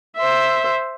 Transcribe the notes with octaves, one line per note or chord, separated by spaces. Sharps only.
C5 E5